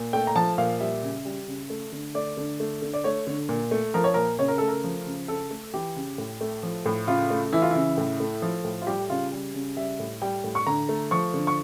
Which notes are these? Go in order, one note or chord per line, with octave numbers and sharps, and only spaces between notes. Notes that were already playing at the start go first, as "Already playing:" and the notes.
Already playing: A#2
A3 G5
A#5
F3 A5
A#2 F5
G3 E5
C#3
G3
C#3
A3
D3
A3 D5
D3
A3
D3
D5
A3 C#5
D3
A#2
A3
F3 A#4
C#5
A#2 A#4
C#3 C#5
A#4
A3 A4
A#4
F3
C#3
C#3 A4
A3
E3 G4
C#3
A2
A3
F3
A2
C#3 F4
A3
E3 E4
F4
C#3 E4
A2
A3
F3
A2
F4
G3 G4
C#3 F4
G3
C#3
G3 E5
A2
G3 G5
A2
C#6
D3 A#5
A3
F3 C#6
D3
C#6